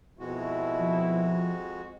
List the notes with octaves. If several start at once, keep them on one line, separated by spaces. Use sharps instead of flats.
F2 B2 G#3 E4 F#4
F3